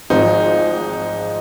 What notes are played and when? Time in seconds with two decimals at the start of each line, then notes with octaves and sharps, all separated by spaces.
0.10 G#1 G#2 F3 C4 D#4